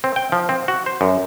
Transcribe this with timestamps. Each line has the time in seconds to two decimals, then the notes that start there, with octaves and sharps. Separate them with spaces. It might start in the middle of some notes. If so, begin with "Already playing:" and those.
0.04 C4
0.16 G5
0.32 F3
0.49 C4
0.68 F#4
0.86 C5
1.01 F#2